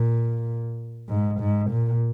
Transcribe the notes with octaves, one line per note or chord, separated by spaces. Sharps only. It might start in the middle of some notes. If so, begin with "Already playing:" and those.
Already playing: A#2
G#2
G#2
A#2